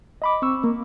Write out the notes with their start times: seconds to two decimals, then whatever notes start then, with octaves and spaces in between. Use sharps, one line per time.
0.22 D#5 B5 D6
0.42 C4 C#6 E6
0.64 A#3